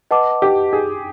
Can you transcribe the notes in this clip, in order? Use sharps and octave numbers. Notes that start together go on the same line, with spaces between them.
B4 D#5 F#5 A5 D6
G4
G#4